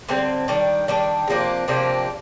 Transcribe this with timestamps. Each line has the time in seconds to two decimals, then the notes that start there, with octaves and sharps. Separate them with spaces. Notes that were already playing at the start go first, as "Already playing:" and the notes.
0.09 D3 G3 C4
0.48 D#3 G3 D4
0.88 D#3 G3 D4
1.28 C3 F3 A#3 D4
1.68 C3 F3 A#3 D4